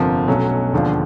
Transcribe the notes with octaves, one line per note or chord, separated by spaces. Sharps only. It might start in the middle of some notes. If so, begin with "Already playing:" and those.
Already playing: G1 F2 C3 F3 A#3
B1 B2 F#3 A3 C#4
E1 D#2 D3 F3